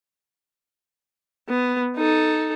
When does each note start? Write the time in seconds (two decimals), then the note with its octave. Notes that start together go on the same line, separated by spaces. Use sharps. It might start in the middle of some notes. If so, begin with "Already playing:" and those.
1.49 B3
1.97 D#4 A4